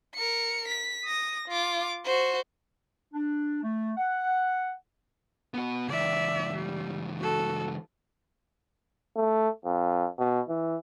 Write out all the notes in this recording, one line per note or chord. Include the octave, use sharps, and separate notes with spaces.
A#4 C#7
B6
D#6 A#6
F4 D6
F#4 C5
D4
A3
F#5
B3 F#4
C#2 E3 D5 E5
G3
F#4 A4
A3
F2
B2
E3